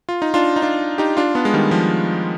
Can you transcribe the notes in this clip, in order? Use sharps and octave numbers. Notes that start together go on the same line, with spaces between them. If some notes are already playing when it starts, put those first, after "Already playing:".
F4
D#4
D4 F4
D#4
D4 F4
D#4 G4
D4 F4
B3 D4
G#3
D#3 G3
F3